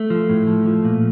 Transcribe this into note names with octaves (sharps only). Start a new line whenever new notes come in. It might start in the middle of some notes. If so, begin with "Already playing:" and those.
Already playing: A3
F3
A2
F3
F3
A#2